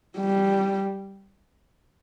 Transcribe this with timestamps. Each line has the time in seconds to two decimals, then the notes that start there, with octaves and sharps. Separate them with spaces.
0.18 G3